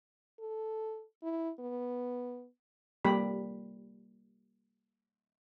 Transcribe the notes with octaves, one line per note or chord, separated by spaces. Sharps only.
A4
E4
B3
G3 A#3 G4 B5